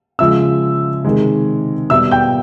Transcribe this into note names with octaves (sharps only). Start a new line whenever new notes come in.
C#3 F3 G#3 E5 E6
C3 D#3 G#3
B2 G3 E5 E6
G5 G6